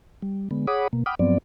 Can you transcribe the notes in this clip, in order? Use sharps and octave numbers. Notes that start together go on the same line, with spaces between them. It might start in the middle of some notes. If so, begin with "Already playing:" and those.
G3
D3 G#3 B3
G#4 C#5 F#5 B5 D6 D#6
B2 A#3
F#5 G5 B5 D6 D#6 F6
G2 F3 F#3 B3 C4 D5